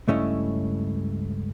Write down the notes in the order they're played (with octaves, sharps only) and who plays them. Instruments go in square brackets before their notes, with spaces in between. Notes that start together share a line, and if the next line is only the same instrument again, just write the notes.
[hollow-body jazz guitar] C#2 G2 A3 C#4 E4 D#5